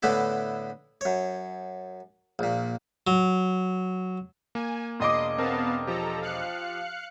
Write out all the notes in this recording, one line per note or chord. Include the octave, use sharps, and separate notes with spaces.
A2 D3 A3 B3 E4
F#2 C#5
A#1 A#2
F#3
A#3 G#5
E1 D#5 C6 D6 D#6
B3 C4 A#4 F5 A5
F3 G4 A4 A#5
F5 F#6 C#7